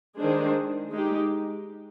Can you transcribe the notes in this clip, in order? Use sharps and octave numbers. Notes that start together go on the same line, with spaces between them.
D#3 G#3 D4 G#4 C5
G#3 D#4 G4